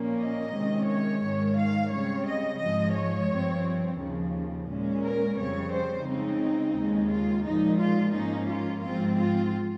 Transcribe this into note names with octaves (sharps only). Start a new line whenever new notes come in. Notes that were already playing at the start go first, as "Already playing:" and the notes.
Already playing: A#2 F3 A#3 C#4
D#5
C3 D#3 G#3 C#4
C#5
G#2 D#3 G#3
F5
C#3 G3 C4 C#5
D#5
G#2 F3 G#3 D#5
C#5
G2 F3 C4
D#2 C#3 F3
A#2 G#3 C#4
A#4
F2 C#3 G3 C4 C#5
C5
C#3 G#3 C4 D#4
D#2 C#3 G#3
F4
A#2 F3 G#3 D#4
F4
G#2 F3 A#3 C#4 D#4
F4
G#2 F3 C4 F4
F4